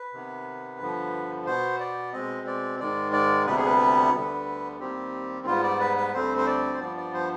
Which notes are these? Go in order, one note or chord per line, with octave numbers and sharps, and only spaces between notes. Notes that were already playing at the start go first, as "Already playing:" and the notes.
Already playing: B4
C3 D#3 B3
G2 D3 F3 B3
B2 B3 C5
D5
B2 G#3 C4 D#5
D5
G#2 D#3 G#3 D5
D5
D2 C3 G3 B3 B4
G#4
B4
D2 D3 G3 B3
D#2 D#3 G3 C4 G4
G#2 G3 B3 F4
D5
B4
B4
D2 D3 G3 C4 C5
C5
D5
C5
G2 F3 B3 D5
D5
C5